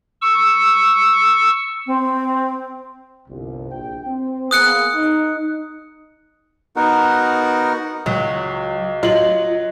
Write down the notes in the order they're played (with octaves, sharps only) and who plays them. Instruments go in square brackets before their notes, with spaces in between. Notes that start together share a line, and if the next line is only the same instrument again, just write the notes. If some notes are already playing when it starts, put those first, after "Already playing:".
[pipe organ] C#6 E6
[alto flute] C4
[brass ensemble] G1 C2
A#1 G5
C4
[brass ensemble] A#3 B3 G#4 [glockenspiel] D#6 F#6 C#7
[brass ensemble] D#4
[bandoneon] B3 D#4 F#4 A#4 F#5
[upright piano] C#2 [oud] F#3
[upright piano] F#3 F#7 [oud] F4 [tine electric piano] D#5